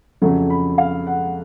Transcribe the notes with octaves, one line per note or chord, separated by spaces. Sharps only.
F2 C#3 F#3 A3
B5
F5
F#5